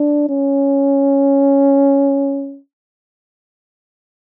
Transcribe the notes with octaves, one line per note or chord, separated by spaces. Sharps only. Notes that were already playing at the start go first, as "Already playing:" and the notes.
Already playing: D4
C#4